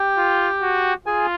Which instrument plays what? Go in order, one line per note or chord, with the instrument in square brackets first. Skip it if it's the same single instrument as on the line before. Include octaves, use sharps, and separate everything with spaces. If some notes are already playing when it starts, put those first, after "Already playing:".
Already playing: [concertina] G4 G5
[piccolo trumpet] F4
F#4
[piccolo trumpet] F4 [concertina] G#4 G#5